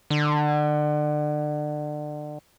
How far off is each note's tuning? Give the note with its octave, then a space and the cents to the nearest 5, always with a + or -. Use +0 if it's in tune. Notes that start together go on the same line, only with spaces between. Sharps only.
D3 +30